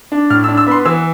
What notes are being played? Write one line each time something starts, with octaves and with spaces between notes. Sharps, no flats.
D4
A2 F6
E6
D4
E6
B3 B5 C6
E3 E6